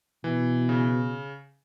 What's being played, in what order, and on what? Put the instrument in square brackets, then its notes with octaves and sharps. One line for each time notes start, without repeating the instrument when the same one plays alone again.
[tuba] B2 [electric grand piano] E3
[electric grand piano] C#3